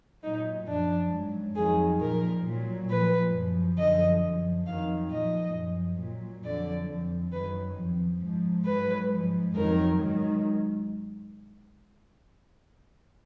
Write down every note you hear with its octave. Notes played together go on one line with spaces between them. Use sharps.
A#2 F#3 D#4
F#2 F3 D4
G#2 F#3
F2 D#3 F#3 G#4
A#2 F3 A#4
A#2 F#3
A#2 F3 B4
F#2 F3
F#2 D3 F3 D#5
F#2 F3
F2 D#3 F#3 F5
A#2 F3 D#5
F#2 F3
A#2 F#3
F2 D3 F#3 D5
F2 F3
F#2 D#3 F#3 B4
F2 F3
G#2 F3
G#2 F#3 B4
G#2 F3
F2 D#3 F#3 A#4
G#2 D#3 F#3